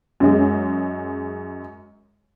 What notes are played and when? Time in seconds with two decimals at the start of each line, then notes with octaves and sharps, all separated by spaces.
0.20 F#2 G#3